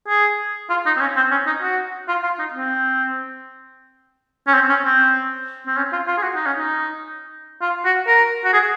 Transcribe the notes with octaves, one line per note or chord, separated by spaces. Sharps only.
G#4
F4
D#4
C4
C#4
C4
C#4
D#4
F#4
F4
F4
D#4
C4
C#4
C4
C#4
C4
C4
C#4
F4
F4
G#4
F#4
D#4
C#4
D#4
F4
F#4
A#4
F#4
G#4